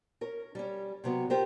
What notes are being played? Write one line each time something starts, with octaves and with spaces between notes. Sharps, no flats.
C#4 A#4
G3 C#4
C3 F#3 B3
F4 G4 A#4 C5